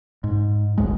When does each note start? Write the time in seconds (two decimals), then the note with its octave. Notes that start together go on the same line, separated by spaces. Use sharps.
0.24 G#2
0.78 D1 G1 D2 G#3